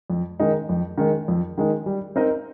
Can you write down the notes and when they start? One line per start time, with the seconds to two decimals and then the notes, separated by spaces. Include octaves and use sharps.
0.10 F2
0.40 D#3 G#3 D#4
0.69 F2
0.98 D#3 G#3 D#4
1.28 F2
1.58 D#3 G#3 D#4
1.86 G3
2.16 C4 D#4 A#4 D#5